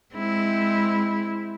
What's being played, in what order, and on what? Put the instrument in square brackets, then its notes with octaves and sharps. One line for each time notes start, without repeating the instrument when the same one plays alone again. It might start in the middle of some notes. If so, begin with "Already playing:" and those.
[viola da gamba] G#3 C4 E4